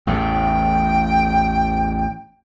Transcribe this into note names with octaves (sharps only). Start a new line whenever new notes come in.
A1 E2 A2 G5